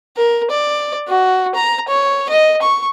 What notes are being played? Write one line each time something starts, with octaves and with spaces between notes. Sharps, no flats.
A#4
D5
F#4
A#5
C#5
D#5
C#6